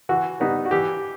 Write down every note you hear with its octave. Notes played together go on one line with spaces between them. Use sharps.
E3 F#4
G3 B3 D#4
F#4
E3 G4